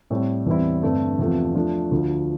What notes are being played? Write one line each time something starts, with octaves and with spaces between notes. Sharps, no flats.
A2 G3 C4
E2 E3 G3 C4 E4
G2 D3 A3 C4
E2 C3 F3 A3
F3 A3 D4
D2 D3 F3